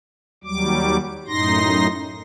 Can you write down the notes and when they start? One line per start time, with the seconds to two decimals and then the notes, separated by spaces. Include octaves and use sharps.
0.44 D#2 F#3 G3 D6
1.28 F#2 A2 D#4 C6 A#6